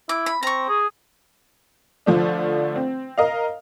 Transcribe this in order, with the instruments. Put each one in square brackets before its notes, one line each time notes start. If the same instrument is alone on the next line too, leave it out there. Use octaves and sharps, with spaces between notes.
[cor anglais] E4 [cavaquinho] D6
[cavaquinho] B5
[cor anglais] C4 [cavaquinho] A#5 C#6
[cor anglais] G#4
[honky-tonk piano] D3 F3 A3 D4
C4
A#4 D#5 F5